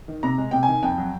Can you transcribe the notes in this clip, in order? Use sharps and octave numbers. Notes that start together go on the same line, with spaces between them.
D#3
C3 A#5
G#3
C3 G5
G#5
D#3
F2 G5
F#3